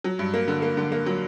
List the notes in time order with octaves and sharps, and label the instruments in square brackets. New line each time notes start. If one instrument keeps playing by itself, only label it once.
[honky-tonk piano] F#3
G2
A#3
D3
A#3
D3
A#3
F#3